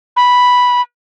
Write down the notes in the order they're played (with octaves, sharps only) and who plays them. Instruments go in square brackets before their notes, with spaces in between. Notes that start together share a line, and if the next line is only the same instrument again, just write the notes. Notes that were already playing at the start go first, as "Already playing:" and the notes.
[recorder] B5